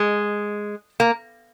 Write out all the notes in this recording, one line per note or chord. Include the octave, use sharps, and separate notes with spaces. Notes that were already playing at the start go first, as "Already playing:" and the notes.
Already playing: G#3
A#3